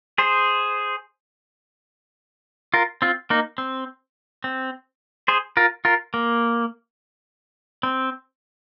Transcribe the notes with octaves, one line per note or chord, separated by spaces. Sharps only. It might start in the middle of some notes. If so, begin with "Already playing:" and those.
G#4 C5
F4 A#4
C4 F4
A#3 D#4
C4
C4
G#4 C5
F4 A#4
F4 A#4
A#3
C4